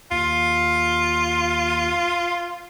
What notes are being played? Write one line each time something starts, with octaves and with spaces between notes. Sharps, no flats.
D#2 F4